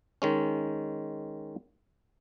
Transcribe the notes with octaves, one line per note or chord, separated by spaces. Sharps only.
D#3 G#3 C#4